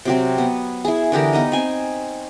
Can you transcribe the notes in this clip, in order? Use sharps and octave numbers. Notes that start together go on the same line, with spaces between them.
C3 F#3 C4
B3
E4 G#4
D3 E3 G4 A#4
B3 D#4 D#5
C4 G#5